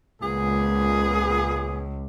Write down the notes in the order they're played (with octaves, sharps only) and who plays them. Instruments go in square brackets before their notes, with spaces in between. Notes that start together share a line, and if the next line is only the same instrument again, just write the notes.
[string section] C#2 [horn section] A#2 B3 G#4